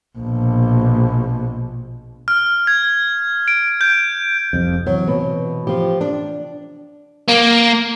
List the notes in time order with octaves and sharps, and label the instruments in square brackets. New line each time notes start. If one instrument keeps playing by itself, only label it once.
[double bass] A#1 B2
[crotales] F6
G#6
D7
G6
[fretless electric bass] F1 C2 F2
[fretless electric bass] C3 E3 [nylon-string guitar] F#3
[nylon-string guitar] B2
F3 G4
D4
[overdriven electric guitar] A#3